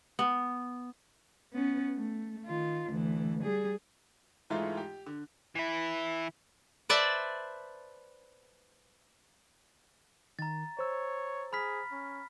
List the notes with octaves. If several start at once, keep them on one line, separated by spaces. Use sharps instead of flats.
B3
B3 C#4
A3
D#3 F4
D2 E3
G3 G#4
G#2 E3 G#3 A3 D#4 F4
G4
D3
E3 E4
B4 C5 D5 E5 A5
D#3 A#5 A6
C5 C#5 E6
G#4 B5 F6 B6
C#4